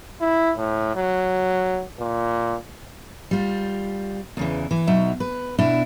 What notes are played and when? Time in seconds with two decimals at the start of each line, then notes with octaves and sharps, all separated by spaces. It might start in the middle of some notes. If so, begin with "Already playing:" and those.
0.21 E4
0.57 A2
0.95 F#3
2.00 A#2
3.31 G3 F4
4.37 E2 C#3 E3
4.71 E3
4.87 B2 F#3 D#4 E5
5.20 B4
5.59 B2 D4 E4